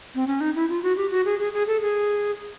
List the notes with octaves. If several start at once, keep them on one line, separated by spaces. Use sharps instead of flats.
C4
C#4
D#4
E4
F4
F#4
G4
F#4
G#4
G#4
G#4
A4
G#4